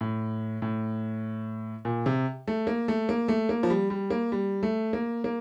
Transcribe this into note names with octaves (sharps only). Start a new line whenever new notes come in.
A2
A2
A#2
C3
A3
A#3
A3
A#3
A3
A#3
F3
G3
G3
A#3
G3
A3
A#3
A#3